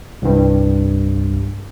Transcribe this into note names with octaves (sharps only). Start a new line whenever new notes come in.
C2 G2